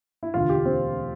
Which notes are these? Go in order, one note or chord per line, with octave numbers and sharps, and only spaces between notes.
E4
E1 D2 D3 F4
G4
C4